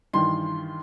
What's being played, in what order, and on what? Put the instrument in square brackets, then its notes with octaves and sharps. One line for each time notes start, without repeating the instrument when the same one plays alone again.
[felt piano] G2 D#3 E3 [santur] C6